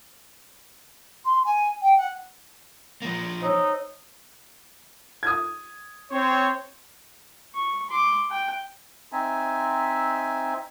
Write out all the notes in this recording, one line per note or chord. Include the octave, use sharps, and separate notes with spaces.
C6
G#5
G5
F#5
F3 A#3
D#4 C5 C#5 E6
D#6 G#6
C4 C5 C#5
C#6
C6 D6
G5
C4 D#4 E5 G#5